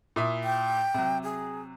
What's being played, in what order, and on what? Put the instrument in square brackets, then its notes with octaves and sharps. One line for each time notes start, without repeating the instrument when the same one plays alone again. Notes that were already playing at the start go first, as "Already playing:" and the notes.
[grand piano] A#2 E4 D#6
[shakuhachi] G5
[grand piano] C3 F#3
[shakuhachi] G#4